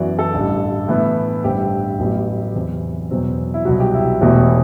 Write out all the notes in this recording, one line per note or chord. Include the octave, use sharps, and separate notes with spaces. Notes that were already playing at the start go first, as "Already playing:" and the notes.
Already playing: F#2 E3 B3 F#4 D5
A4
A1 G2 D3
A2 E3 B3 E4
A1 G2 D3 A3 C4 G4
A1 A2 F#3 B3
E2 C3 F#3 C4
E2 B2 F#3 C4
E4
C2 B2 F#3 F#4
G4
E4
E1 E2 B2 A3 E4 G4